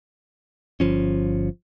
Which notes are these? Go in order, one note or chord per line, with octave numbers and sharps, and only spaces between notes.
G1 F3 C#4